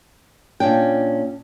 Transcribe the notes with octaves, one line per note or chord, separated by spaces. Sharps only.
A#2 C#4 D4 G5